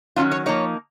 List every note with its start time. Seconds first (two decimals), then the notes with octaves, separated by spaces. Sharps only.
0.16 D#3 F#3 C#4 F4
0.32 C#5
0.46 F3 A#3 D#4 C#5